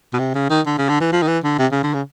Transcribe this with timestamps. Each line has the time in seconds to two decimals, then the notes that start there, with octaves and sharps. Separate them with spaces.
0.13 B2
0.19 C3
0.35 C#3
0.50 D#3
0.66 D3
0.78 C#3
0.89 D3
1.00 E3
1.12 F3
1.22 D#3
1.28 E3
1.43 D3
1.58 C3
1.71 C#3
1.83 D3
1.94 C#3